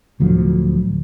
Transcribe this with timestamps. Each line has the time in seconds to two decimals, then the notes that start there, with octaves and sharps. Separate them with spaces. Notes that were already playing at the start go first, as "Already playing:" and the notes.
0.20 D1 D2 F3 F#3